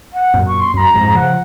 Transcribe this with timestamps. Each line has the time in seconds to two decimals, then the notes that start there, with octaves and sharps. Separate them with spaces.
0.13 F#5
0.34 F#2 A#2
0.47 C#6
0.60 C6
0.74 F#2 A#5 C6
0.94 F2 G#2
1.14 C#3 F3 F#5